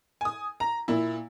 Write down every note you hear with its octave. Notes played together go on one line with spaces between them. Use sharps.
G#5 D#6
A#5
A#2 E4